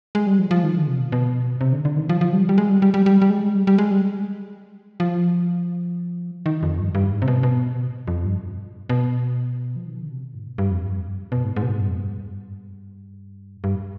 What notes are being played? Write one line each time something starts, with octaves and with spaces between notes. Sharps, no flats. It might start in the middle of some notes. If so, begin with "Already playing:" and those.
G#3
G3
F3
F3
D#3
D3
C3
B2
B2
C3
D3
D3
D#3
F3
F3
G3
G3
G#3
G3
G3
G3
G3
G3
G#3
G3
G3
G#3
G3
F3
D#3
F2
G2
G2
G#2
C3
B2
C3
B2
F2
G2
B2
F3
D#3
D3
C3
B2
G#2
B2
G2
F2
G2
F2
G2
B2
G#2
G#2
B2
G#2
G2
F2
G2
G2